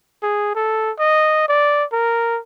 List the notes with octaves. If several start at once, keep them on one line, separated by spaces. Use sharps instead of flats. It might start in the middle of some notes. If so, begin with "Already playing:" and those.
G#4
A4
D#5
D5
A#4